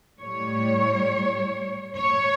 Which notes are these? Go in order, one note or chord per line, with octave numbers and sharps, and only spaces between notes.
A2 G3 C#5
C#5